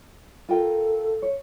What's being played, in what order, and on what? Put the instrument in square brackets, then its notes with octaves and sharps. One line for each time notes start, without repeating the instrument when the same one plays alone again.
[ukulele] F4 A#4 G5 [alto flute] A4
[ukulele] C#5